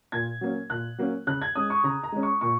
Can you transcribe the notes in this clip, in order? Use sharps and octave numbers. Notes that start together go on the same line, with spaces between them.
A#2 G#6
F#3 A#3 C#4
A#2 F#6
F#3 A#3 C#4
C#3 F#6
G#6
G#3 C#4 D#6
C#6
C#3 A#5
A#5
G#3 C#4
C#6
A#2 C#6